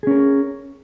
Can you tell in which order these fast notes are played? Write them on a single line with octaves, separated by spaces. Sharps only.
G#4 C#4 A#4